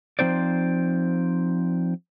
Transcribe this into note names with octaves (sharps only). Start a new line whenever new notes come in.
F3 C4 D#4 C5 D5